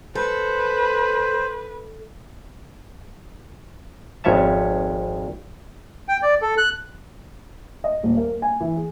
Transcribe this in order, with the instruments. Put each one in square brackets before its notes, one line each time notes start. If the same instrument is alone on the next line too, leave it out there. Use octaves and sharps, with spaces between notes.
[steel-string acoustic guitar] A4 [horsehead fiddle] B4 [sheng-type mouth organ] C5
[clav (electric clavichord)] G#1 F2 C#4 C#5 E5 A5
[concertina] G5
D5
A4
F#6
[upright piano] D#5
D#1
A#3
G#5
E3
G#4